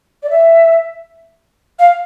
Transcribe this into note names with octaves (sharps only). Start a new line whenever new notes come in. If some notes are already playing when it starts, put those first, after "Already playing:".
D5
E5
F5